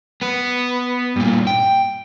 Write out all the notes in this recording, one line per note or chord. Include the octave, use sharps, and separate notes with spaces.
B3 B4
G2 A#2
G5